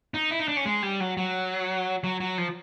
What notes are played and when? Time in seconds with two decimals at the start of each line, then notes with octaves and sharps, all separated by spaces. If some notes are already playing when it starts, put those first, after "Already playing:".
0.14 D#4
0.31 E4
0.39 D#4
0.48 D4
0.57 C#4
0.65 G#3
0.83 G3
1.00 F#3
1.17 F#3
2.04 F#3
2.20 F#3
2.38 F3